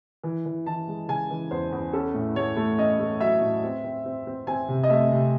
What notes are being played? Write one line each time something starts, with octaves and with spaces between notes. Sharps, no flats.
E3
E3
E3 A5
G#3
C#3 G#5
E3
E2 C5
E2
C#4 A4
A2
A3 C#5
A3
C#4 D#5
A3
F#3 E5
A2
C4
C4
C4
C4
C4 G#5
C3
D#5
A3 E5
C3